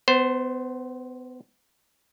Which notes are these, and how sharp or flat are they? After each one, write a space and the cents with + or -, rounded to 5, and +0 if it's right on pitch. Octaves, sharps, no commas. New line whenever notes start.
B3 +35 C5 +0